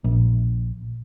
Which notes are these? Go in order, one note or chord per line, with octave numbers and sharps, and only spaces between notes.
A#1